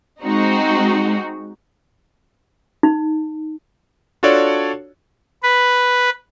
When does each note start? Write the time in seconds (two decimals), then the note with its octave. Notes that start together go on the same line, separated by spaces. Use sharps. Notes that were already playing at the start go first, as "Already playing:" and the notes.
0.23 G#3 C4 D#4 F#4
2.83 D#4
4.23 D4 F4 F#4 A4 C#5 D5
5.43 B4